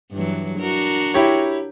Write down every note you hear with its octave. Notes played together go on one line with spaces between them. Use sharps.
G2 E3 F#3
D4 F#4 A#4
E4 G4 C#5